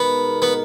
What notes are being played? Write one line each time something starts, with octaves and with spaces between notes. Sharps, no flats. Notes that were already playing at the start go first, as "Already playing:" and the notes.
Already playing: B2 G#3 B3 D#4 A#4
B3